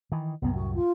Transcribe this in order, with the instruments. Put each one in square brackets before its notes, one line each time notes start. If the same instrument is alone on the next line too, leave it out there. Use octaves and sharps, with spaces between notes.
[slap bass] D#3 E3
[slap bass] C2 F#2 A2 [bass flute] B3
[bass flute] F#4
F4